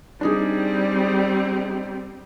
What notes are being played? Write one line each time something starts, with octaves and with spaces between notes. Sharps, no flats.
G3 C4 D4 D#4 G#4